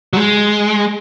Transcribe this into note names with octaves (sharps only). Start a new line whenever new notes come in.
F#3
G#3